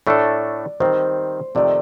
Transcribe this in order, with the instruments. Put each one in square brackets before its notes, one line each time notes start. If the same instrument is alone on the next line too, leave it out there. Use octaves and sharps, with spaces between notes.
[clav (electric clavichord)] A2 A3 D4 A4 [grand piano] D5
[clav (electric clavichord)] D#3 G3 C4 [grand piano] C5
[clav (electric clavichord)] F2 C3 D#3 A3 [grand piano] D5